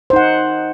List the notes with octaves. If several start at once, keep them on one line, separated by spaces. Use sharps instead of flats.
D#4 C5 F#5